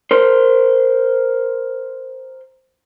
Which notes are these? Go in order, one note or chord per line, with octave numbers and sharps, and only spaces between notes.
A#4 C5